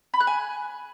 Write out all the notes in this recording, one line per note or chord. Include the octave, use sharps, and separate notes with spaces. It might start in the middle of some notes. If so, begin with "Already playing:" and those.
B5
F#6
G#5